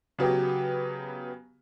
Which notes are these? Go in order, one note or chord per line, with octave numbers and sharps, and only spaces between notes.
C#3 F#3 B3 G4